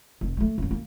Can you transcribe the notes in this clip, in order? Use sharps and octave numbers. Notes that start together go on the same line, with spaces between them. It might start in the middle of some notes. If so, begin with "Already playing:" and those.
F1
G3 A3
F#2 A#3
A#3